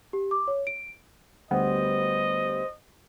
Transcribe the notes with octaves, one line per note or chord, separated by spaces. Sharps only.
G4
D6
C#5
D7
D2 G3 B3 C5 D#5